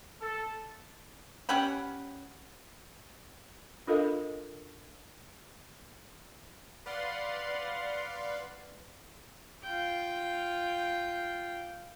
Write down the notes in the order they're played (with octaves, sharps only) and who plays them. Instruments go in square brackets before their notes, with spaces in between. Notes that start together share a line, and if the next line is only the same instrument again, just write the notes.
[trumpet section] A4
[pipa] C#4 G4 F#5 B5
[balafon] D4 F4 A4 A#4 D#5 F5
[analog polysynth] B4 D5 F5 F#5 C6
[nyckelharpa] F4 G5